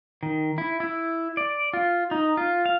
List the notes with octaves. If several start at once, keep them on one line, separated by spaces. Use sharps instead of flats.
D#3
E4
E4
D5
F4
D#4
F4
F5